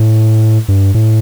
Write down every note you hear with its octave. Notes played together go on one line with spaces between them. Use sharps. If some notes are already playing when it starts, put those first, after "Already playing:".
Already playing: A2
G2
A2